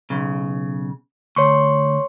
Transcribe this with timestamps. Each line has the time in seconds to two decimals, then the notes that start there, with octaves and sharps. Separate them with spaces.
0.10 B1 C#3
1.36 D2 C#5 C6 C#6